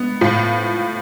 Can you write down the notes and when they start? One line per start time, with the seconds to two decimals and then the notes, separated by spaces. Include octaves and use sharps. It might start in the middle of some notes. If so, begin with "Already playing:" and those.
Already playing: B3
0.21 A2 F3